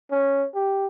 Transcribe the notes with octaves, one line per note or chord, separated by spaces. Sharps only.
C#4
G4